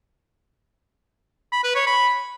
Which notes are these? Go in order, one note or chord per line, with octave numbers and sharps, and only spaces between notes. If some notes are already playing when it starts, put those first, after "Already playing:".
B5
B4
C#5
B5